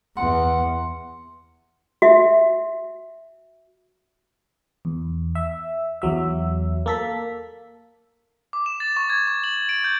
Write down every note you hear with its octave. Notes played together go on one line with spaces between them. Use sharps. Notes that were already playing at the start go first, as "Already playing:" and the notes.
E2 F#5 C6
F#4 E5
E2
E5
E2 F#3 E5
A#3 A4 B6
D6
E7
A6
C#6
G#6
C#6
F#7
F#7
D7
G6